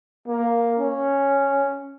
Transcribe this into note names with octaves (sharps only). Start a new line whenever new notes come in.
A#3
C#4